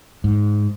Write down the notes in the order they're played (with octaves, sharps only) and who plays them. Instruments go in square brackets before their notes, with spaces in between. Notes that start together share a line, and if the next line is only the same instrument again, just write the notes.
[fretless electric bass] G#2